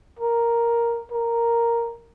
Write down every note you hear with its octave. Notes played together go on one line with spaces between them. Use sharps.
A#4
A#4